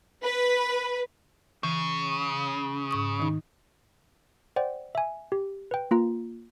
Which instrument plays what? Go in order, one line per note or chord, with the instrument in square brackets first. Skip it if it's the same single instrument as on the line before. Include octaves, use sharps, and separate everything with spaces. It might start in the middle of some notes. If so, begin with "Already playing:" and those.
[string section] B4
[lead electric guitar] C#3 [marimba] E3
[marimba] G#2 C#6 D#6
D#3 D#4
[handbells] C5 D5 F#5 G5
E5 G#5
G4
B4 G5
A#3 F4 A#5